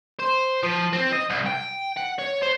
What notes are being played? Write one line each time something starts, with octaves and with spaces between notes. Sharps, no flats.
C5
F3
C4
D#5
C2
G5
F#5
C#5
C5